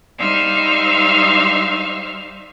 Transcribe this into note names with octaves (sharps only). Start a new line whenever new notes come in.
G3 D#4 C5 E5 F5 F6